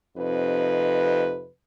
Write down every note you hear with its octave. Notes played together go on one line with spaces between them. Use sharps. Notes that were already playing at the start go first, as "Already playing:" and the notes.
F2 C3 D#4 B4